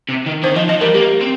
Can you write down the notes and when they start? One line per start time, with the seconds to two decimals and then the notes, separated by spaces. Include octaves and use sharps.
0.09 C3
0.26 D#3
0.43 D#3 C5
0.55 F3 D#5
0.69 F3 D#5
0.81 G3 A#4
0.94 A#3 G4
1.21 C4